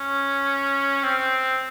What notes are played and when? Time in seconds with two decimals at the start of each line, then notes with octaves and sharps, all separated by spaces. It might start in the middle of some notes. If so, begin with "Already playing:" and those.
Already playing: C#4
1.03 C4